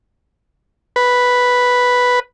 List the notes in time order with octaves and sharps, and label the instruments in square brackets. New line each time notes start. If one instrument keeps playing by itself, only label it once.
[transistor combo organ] B4